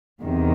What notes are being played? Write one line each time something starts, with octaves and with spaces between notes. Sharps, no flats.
E2 C3 D#3